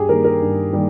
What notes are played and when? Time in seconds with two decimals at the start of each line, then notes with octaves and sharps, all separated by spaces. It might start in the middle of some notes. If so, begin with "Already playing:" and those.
Already playing: G2 G4 G#4
0.09 D#3 G3 A#3 A#4
0.25 A#4
0.42 G2
0.73 D#3 G3 A#3